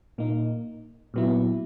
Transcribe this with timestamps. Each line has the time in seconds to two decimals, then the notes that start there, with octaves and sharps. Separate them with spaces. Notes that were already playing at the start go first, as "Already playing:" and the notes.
0.18 A#2 A#3 D#4
1.14 A#2 F#3 B3 E4